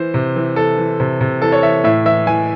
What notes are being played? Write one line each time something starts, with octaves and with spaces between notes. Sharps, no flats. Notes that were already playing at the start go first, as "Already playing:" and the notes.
Already playing: E3 C5
C3
E3
E3 A4
E3
C3
C3
E3 A4
C#5
E3 E5
A2 E5
E3 E5
E3 G#5